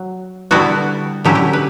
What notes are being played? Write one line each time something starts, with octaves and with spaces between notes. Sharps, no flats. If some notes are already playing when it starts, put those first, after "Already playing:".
Already playing: F#3
D3 G3 B3 E4 F#4
D3 F#3 C#4 E4 G4
G4
B4